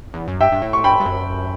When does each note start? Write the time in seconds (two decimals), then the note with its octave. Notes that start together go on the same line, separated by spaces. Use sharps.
0.14 E2
0.28 F#2
0.40 G2 E5 G5
0.52 G2
0.62 A2
0.73 C#6
0.84 G2 G5 B5
1.00 G2
1.06 F#2